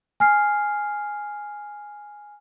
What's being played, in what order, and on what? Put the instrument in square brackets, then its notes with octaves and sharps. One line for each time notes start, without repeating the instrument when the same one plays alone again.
[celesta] G#5 F6 C7